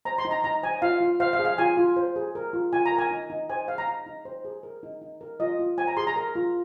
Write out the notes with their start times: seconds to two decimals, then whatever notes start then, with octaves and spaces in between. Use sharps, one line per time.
0.05 C5 A#5
0.18 C6
0.25 D#4
0.31 A#5
0.44 D#4 A#5
0.63 C5 G#5
0.82 F4 F5
1.01 F4
1.20 C5 F5
1.33 F5
1.39 G#4
1.45 F5
1.58 F4 G#5
1.77 F4
1.96 C5
2.16 G#4
2.35 A#4
2.53 F4
2.73 F4 G#5
2.86 A#5
2.92 A#4
2.98 G#5
3.11 D#4
3.30 D#4
3.50 C5 G#5
3.68 G#4 F5
3.78 A#5
3.87 D#4
4.06 D#4
4.25 C5
4.45 G#4
4.63 A#4
4.83 D#4
5.01 D#4
5.21 A#4
5.40 F4 D#5
5.59 F4
5.78 C5 G#5
5.88 A#5
5.97 G#4 C6
6.07 A#5
6.16 A#4
6.35 F4